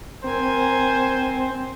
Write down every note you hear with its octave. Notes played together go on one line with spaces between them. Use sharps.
C4 A#4 C5 G#5